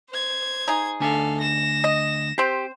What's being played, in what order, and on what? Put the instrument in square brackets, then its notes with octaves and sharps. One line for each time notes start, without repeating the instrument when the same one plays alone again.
[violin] C5 G#6
[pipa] D#4 G#4
[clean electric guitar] D2 D4 G#5 [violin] A4 F5
[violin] A#6 E7
[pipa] D#5
[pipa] C4 C5 [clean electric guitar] G4